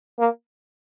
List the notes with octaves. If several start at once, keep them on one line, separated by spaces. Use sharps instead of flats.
A#3